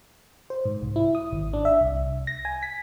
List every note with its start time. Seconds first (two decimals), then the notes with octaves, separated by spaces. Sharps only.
0.50 C5
0.65 G#2
0.82 C2
0.96 E4
1.15 D#6
1.33 G#1
1.53 D4
1.65 E5
1.81 C2
2.27 A#6
2.45 G#5
2.63 B6